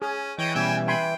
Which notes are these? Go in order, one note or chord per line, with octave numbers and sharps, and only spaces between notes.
C#4 G#4
E3 C#5 D#5 G5
B2 G3 C#4 E5 G5 G#5
G5 G#5 B5 C6